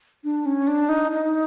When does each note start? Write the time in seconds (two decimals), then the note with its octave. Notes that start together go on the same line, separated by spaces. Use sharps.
0.24 D4
0.46 C#4
0.67 D4
0.89 D#4
1.11 D#4